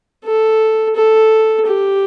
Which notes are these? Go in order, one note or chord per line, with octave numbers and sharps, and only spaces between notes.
A4
A4
G4